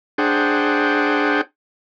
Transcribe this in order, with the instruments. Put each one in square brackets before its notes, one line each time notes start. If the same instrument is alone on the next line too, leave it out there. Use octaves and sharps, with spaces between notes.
[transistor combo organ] D4 G#4 C5 F#5 G5